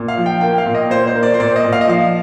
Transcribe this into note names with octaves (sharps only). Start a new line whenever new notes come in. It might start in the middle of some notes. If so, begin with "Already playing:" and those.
Already playing: A#2
F5
F3
G5
A#3 G5
F5
A#2
D#5
A#2 C5
C5
A#3
D5
C5
A#2 D5
D#5
A#2
F5
D#5
F3 F5